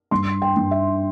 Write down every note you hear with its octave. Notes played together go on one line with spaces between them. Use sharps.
G2 C6
G5
G2
E5